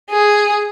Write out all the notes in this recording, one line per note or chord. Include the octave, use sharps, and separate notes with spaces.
G#4